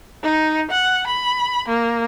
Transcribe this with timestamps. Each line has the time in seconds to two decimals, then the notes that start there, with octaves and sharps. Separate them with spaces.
0.23 D#4
0.71 F#5
1.07 B5
1.68 A#3